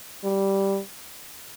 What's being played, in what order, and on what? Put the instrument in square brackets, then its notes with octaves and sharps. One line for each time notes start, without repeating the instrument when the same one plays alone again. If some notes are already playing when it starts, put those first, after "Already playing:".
[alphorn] G3